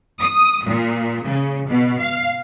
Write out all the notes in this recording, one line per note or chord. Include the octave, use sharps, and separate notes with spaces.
D#6
A#2
C#3
B2
F5